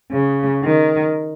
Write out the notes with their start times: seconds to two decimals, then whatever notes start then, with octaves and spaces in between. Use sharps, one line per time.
0.12 C#3
0.64 D#3